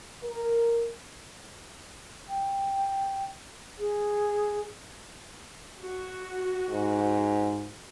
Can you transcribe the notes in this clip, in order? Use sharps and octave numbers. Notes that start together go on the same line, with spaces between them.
A#4
G5
G#4
F#4
G#2